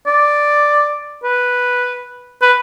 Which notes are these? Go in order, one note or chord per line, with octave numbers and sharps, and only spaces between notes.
D5
B4
B4